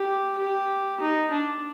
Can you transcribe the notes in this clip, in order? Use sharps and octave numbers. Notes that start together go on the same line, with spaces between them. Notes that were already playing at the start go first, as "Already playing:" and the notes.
Already playing: G4
G4
D#4
D4